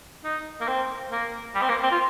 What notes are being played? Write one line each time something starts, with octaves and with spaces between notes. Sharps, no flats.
D#4
A#3
C4
A#3
G3
C4
A#3
C4
F4